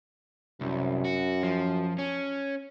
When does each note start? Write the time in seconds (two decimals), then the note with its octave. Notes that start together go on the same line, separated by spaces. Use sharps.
0.61 C2 F#2
1.05 F#4
1.43 F3
1.98 C#4